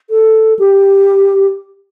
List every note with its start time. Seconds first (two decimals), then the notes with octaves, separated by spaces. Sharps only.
0.10 A4
0.59 G4